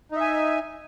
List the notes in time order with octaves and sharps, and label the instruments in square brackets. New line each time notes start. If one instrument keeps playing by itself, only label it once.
[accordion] D#4
E5
G#5